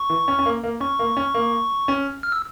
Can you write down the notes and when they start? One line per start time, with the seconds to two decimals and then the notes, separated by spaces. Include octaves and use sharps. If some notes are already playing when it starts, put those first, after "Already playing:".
Already playing: C#6
0.10 E3
0.28 C#4
0.39 C#4
0.46 A#3
0.63 A#3
0.80 C#4 C#6
0.99 A#3
1.17 C#4
1.34 A#3
1.88 C#4
2.23 F6
2.32 E6